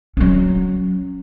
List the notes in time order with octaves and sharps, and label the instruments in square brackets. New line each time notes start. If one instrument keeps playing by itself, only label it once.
[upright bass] F#3 C#4